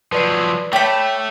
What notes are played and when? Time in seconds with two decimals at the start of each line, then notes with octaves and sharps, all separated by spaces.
0.12 F3 F#3 B4 D5 C7
0.73 A3 C#5 G5 B5 D6